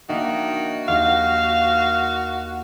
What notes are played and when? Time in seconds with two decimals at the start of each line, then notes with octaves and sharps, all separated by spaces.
0.09 D#3 A#3 D4 F#4 E5
0.88 D#2 F5